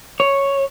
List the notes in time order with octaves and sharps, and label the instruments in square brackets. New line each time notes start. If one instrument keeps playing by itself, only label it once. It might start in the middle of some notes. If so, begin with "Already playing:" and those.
[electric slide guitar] C#5